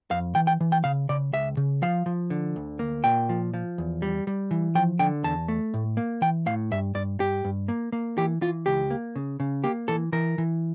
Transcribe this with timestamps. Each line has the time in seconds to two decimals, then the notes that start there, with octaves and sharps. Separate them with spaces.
0.11 F2 F5
0.35 E3 G5
0.47 G5
0.61 E3
0.72 G5
0.84 C#3 F5
1.09 C#3 D5
1.33 C#2 E5
1.57 C#3
1.82 F3 F5
2.06 F3
2.30 D3
2.56 D2
2.79 A#3
3.04 A#2 G5
3.29 F3
3.54 F3
3.78 E2
4.02 G3
4.27 G3
4.51 E3
4.75 F3 G5
4.99 D3 G5
5.24 E2 A5
5.48 A3
5.74 A2
5.97 A#3
6.22 E3 G5
6.46 A2 F5
6.71 G2 E5
6.95 G2 D5
7.19 G2 G4
7.45 G2
7.68 A#3
7.92 A#3
8.18 E3 G4
8.41 E3 F4
8.66 C#2 G4
8.90 A#3
9.16 C#3
9.40 C#3
9.64 A#3 G4
9.88 E3 A4
10.12 E3 A#4
10.38 E3